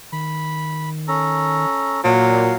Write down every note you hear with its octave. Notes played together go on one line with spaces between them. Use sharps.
D#3 B5
C#4 A4 A#5
A#2 F#3 F5